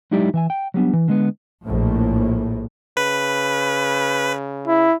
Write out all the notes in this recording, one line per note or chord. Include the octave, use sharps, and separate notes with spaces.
F#3 G#3 D#4 E4 G4 D5
E3 E5 G#5
G5
F#3 G3 B3 D4
E3
D3 G#3 B3
A#1 A2
C#3 B4
E4